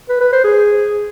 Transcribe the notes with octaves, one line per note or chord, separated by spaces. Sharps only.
B4
B4
C5
G#4